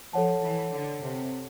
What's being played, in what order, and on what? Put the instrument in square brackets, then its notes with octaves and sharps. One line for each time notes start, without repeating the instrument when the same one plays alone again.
[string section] F3 [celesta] A4 C#5 F#5 A5
[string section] E3
D3
C3